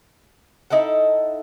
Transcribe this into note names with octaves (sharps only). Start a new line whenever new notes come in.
D#4 E4 A4 F#5